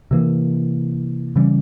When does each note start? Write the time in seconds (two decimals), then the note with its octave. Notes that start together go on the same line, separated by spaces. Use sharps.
0.11 C3 E3 A#3
1.36 C#3 E3 G3 C#4